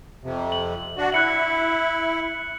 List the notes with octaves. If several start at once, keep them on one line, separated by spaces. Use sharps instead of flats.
F2 C3
F#7
D4 F#4
E4 F#6 C#7 F#7